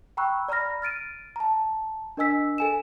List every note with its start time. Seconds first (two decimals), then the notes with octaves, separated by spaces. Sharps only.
0.17 G5 A#5 B5 C#6 E6 F#6
0.48 D5 A#5 B5 F6 A#6
0.82 F6 A6 D7 D#7
1.36 A5 A#5
2.17 D4 A#4 D#5 G#5 E6 B6
2.58 A4 G#5 E7